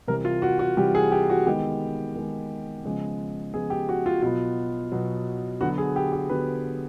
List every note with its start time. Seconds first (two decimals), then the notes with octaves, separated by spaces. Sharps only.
0.07 C3 E3 G3 A#4
0.25 F4
0.42 F#4
0.59 F#4
0.77 C3 E3 G3 G4
0.95 G#4
1.12 G4
1.30 F#4
1.47 D#3 G#3 B3 G4
2.16 D#3 G#3 B3
2.84 C#3 F3 G#3 B3
3.54 C#3 F3 G#3 B3 G#4
3.70 G4
3.89 F#4
4.06 F4
4.22 B2 F#3 B3 F4
4.92 B2 F#3 B3
5.61 D3 F#3 B3 F#4
5.78 G#4
5.96 G4
6.13 G4
6.29 D3 F#3 B3 B4